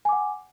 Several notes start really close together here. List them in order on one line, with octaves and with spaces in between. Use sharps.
G#5 D6 F#5